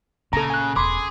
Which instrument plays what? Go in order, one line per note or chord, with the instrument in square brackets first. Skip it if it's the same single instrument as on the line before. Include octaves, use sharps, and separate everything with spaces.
[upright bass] A#2 [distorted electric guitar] C#3 [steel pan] A4 A#5
[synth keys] G#5 F#6
[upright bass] E1 [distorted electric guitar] G#4 [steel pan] B5 [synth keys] C6 D6